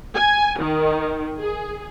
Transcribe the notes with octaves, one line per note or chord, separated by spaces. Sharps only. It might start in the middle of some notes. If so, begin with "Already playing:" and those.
G#5
D#3
G#4